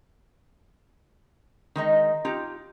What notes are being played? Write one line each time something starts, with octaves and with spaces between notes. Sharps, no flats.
D#3 G#3 D#4
D#4 F4 G4